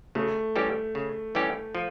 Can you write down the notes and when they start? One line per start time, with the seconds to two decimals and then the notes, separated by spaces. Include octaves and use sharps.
0.15 C#3 A3
0.56 E3 G3 C#4 G4
0.95 C#3
1.35 E3 G3 C#4 G4
1.75 F3